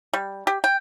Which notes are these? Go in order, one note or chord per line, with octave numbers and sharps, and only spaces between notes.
G3
G4
G5